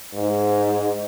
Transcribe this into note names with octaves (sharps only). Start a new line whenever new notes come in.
G#2